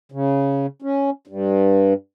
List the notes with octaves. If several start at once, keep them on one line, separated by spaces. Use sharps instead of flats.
C#3
C#4
G2